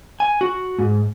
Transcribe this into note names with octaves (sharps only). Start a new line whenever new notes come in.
G#5
F#4
G#2